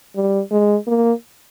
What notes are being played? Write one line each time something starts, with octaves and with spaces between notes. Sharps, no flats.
G3
G#3
A#3